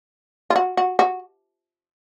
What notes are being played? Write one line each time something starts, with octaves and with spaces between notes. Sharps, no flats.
F4
F#4
F#4
F#4